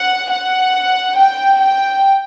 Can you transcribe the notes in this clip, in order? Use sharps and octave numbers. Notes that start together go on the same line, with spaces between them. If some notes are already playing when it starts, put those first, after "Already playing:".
Already playing: F#5
F#5
G5
G5